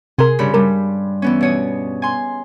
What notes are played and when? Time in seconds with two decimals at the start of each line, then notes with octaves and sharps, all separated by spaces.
0.18 C3 G#4 A#4 C6
0.39 G2 C#3 B5
0.54 G2 G3 A#4
1.22 E3 B3 C#4
1.41 B2 C#5 D#5
2.02 G#5 C6